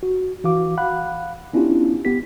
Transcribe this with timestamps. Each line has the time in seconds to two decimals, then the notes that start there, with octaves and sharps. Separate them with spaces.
0.03 F#4
0.44 E3 F#4 F5 D6
0.77 F5 F#5 B5 F#6
1.53 B3 C#4 D4 E4 F4 G4
2.05 B3 G4 B6